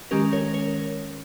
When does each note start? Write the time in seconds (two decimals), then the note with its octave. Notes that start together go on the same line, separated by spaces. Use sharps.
0.11 D#3 G#3 C#4 G4 A#4
0.32 A#4 C#5
0.54 A#4 C#5